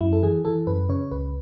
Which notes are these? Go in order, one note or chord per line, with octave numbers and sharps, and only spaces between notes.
F#2 E4
A4
E3 G#4
E3 A4
F#2 B4
C#3 C#5
C#2 B4